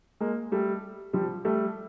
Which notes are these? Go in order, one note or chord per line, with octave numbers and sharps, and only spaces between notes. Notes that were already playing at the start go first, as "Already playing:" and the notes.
G#3 A#3
G3 A3
F3 G3
G3 A3